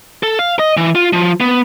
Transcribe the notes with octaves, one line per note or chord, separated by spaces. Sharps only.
A4
F5
D#5
E3
F4
F3
B3